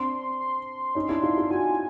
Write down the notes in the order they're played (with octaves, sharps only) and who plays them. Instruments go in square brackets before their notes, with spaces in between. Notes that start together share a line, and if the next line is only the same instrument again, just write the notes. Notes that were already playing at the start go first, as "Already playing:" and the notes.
Already playing: [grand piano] C4 D4 [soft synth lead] C6
[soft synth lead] C6
[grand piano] C#4 D#4
D4 E4
D#4 F4
D#4 F4
[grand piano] E4 F#4 [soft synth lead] G#5